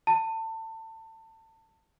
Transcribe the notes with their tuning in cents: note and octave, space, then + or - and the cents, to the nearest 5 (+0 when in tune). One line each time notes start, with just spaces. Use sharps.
A5 +25